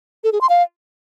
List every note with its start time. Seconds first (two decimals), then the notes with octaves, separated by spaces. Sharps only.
0.24 A4
0.32 G#4
0.41 C6
0.50 F5